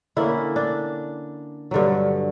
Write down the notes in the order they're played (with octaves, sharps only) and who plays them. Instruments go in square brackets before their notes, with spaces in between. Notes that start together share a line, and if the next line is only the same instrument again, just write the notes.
[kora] D3 A#3 C#4 E4
D4
G2 D3 F#3